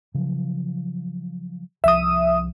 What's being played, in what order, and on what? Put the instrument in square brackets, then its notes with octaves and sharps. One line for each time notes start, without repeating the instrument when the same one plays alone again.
[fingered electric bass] C#3 F3 F#3
[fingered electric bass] C2 F3 [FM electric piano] E5 D#6